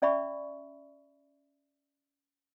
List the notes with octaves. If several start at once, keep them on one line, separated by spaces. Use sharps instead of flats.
C#4 D5 E5 B5 C#6